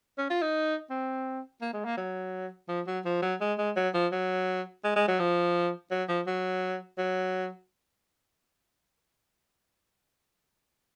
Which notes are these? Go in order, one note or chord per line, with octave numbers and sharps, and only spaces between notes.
C#4
F4
D#4
C4
A#3
G#3
A#3
F#3
F3
F#3
F3
F#3
G#3
G#3
F#3
F3
F#3
G#3
G#3
F#3
F3
F#3
F3
F#3
F#3